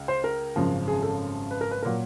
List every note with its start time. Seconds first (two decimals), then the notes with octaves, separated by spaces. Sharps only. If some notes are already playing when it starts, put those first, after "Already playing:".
Already playing: C#2
0.08 C5
0.24 A#4
0.56 G#1 F#2 C#3 F3
0.88 G#4
1.03 A4
1.51 B4
1.61 A#4
1.71 B4
1.83 A#2 F#3 A#4